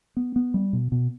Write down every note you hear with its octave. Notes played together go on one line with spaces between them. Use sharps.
B3
B3
G3
B2
B2